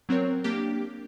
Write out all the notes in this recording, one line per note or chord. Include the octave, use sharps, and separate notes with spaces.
F#3 C4 A#4 C#5
A#3 D4 G4